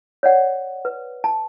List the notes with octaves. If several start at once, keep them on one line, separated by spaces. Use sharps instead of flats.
C#5 D5 F#5
B4
A5